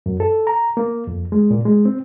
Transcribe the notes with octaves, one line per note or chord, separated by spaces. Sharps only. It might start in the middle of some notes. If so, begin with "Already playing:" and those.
F#2
A4
A#5
A#3
F2
G#3
A#2
G#3
C4